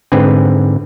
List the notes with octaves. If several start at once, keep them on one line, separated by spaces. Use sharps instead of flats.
G#2 D3 C4 B4